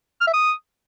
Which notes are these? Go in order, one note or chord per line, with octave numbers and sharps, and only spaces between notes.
F6
E5
D#6